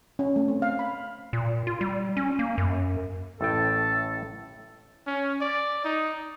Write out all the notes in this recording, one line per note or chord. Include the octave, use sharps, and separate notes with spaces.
C#4
A3
C4
F5
B5
A#2
F4
G3
C#4
A#3
F#2
A1 A2 A4 G5
C#4
D5
D#4